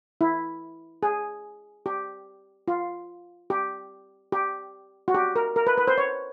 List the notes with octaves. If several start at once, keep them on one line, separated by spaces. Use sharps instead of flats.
E4
G#4
G4
F4
G4
G4
F#4
G4
A#4
A#4
B4
B4
C5
C#5